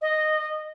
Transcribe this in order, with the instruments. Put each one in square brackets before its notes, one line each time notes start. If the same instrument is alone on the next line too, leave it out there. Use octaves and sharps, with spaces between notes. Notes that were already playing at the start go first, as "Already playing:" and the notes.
[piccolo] D#5